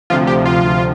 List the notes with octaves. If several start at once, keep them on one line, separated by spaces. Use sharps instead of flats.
D2 C3 F3 F4
G4
F4
D2 C3 F3